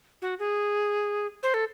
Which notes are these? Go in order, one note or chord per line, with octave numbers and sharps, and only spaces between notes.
F#4
G#4
C5
A4